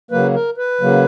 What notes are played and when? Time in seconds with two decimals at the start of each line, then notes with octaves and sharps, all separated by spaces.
0.11 C#3 F#3 A#3 B4
0.34 A#4
0.57 B4
0.81 C#3 F#3 A#3